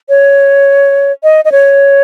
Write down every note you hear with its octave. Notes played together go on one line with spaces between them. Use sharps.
C#5
D#5
D#5
C#5